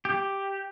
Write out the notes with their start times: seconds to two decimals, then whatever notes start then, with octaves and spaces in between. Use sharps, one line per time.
0.05 G4